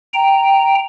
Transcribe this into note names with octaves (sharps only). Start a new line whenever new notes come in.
G5 A#5